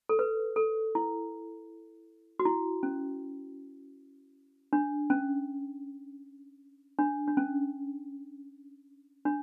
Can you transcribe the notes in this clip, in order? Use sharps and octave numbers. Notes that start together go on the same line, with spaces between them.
A4
B4
A4
E4
F#4
E4
C#4
D4
C#4
D4
D4
C#4
D4